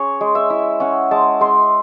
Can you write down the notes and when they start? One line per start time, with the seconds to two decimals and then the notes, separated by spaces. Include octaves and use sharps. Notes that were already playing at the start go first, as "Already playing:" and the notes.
Already playing: C#4 G#4 C#5
0.21 G#3
0.35 E5
0.50 E4
0.80 C#4 F#5
1.11 G#3 A5
1.40 G#3 C6